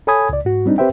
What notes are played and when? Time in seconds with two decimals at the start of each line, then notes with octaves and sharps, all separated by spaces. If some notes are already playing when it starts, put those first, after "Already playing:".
0.07 A4 C#5 G#5 B5 D#6 G#6
0.29 C#2 D5
0.45 G#2 F#4
0.66 G3 C4 D4 D#4
0.78 C4 G4 B4 C5 E5 G5